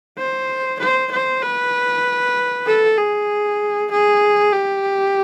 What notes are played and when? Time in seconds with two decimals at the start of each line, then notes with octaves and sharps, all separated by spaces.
0.18 C5
0.80 C5
1.12 C5
1.41 B4
2.66 A4
2.97 G#4
3.91 G#4
4.53 G4